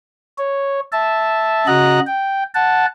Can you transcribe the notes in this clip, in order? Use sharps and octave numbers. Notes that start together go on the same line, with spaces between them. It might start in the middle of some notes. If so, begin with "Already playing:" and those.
C#5
E5 A5
C#3 F#4 D#5 A#5 F#6
G5
F#5 A5